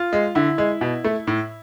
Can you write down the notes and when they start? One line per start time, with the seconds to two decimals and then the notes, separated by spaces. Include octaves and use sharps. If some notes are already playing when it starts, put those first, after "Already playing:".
Already playing: F4
0.13 G#3
0.35 D3 E4
0.58 G#3
0.81 B2
1.04 A3
1.27 A2